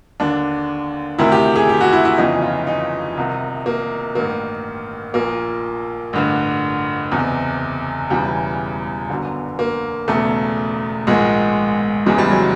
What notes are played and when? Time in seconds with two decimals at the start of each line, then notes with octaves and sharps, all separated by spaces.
0.20 D#2 D3 D4
1.18 D2 C3 D#3 E4
1.32 G4
1.56 G#4
1.69 G4
1.81 F#4
1.93 E4
2.05 E4
2.18 G1 F2 C#3 E3 D#4
2.42 F4
2.67 D#4
3.17 C2 C3 D#3
3.66 A#3
4.15 A1 G2 D#3 A#3
5.14 A#1 A#2 A#3
6.13 A1 G2 D3
7.12 F#1 E2 C3
8.10 E1 E2 C#3 E3 G3
9.10 G1 F#2 D3
9.59 A#3
10.08 E1 E2 C#3 A3
11.07 A#1 G#2 D#3 G#3
12.06 F#1 E2 C#3 E3 G#3
12.18 G3
12.31 F#3